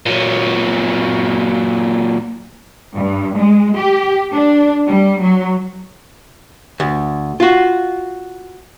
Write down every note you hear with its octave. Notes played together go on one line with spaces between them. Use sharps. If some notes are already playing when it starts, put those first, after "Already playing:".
A#2 F#3
G2
G#3
G4
D4
G3
F#3
D2
F4 F#4